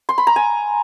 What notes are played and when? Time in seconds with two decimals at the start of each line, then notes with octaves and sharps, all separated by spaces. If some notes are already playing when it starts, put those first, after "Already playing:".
0.09 C6
0.18 B5
0.27 A#5
0.36 G#5